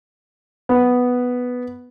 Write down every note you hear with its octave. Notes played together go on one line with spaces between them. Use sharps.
B3